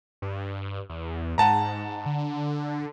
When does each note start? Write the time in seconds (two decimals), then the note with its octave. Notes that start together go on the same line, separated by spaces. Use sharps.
0.22 G2
0.90 E2
1.38 G#2 F#5 A5 A#5
2.06 D3